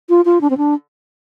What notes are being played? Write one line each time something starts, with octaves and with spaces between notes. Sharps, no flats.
F4
F4
D4
C4
D4